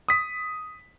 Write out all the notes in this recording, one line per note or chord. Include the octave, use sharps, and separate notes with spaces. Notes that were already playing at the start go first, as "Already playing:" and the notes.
D#6 B6